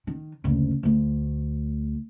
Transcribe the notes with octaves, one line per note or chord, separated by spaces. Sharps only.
D#3
F#1 D2
D2 A3